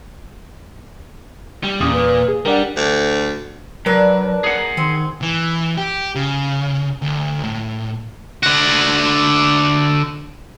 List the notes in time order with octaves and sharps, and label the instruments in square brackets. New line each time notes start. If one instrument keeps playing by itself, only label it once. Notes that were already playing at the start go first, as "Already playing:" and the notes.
[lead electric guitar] G3
[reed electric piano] E2 D#6 [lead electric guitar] A#2 [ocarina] C#4
[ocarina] B4
[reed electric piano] G#4
[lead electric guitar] G3 [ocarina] D4 [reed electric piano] A#4 D5 F#5
[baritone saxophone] D2
[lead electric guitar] F#3 [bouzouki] D4 B4 [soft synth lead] A#4
[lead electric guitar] G#4 F#5
[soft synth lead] D#3 [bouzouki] C4
[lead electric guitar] E3
G4
C#3
D2
A2
[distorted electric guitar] D3 F#4